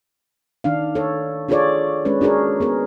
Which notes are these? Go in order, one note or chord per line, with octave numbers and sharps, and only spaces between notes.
D#3 D4 F5
A4 C#5
D4 F4 G#4 A4 C#5 D5
G#3 C#4 D4 B4
C#4 D4 F#4 G#4 A#4 C#5
B3 G#4 A#4